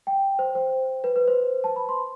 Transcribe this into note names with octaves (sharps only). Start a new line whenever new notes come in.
G5
C5
C5
B4
B4
C5
A5
B5
C6